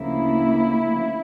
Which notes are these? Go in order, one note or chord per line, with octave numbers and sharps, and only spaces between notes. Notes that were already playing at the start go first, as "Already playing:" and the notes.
Already playing: D2 C#3 F3 A#3 E4